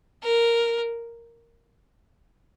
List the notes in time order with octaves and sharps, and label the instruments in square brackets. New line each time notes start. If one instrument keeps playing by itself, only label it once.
[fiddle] A#4